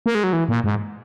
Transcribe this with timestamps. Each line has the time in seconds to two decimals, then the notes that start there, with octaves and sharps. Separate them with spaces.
0.06 A#3
0.15 G#3
0.24 F#3
0.33 E3
0.49 A#2
0.64 G#2